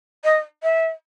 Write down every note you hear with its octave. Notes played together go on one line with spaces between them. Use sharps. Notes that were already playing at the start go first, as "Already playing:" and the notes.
D#5
E5